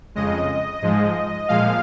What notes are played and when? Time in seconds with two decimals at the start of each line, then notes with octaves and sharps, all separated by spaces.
0.15 F2 C#3 G#3 D#5
0.82 G#2 F3 G#3
1.48 A#2 F3 G#3 F5